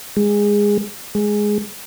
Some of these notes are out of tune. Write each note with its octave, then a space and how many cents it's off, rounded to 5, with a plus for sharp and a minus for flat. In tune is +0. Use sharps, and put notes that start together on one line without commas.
G#3 -15
G#3 +0